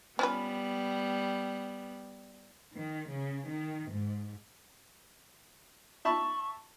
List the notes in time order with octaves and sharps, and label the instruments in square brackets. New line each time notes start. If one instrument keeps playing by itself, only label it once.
[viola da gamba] G3 B3 [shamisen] C#4 F4 B4
[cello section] D#3
C#3
D#3
G#2
[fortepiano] E5 A5 B5 [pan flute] C#6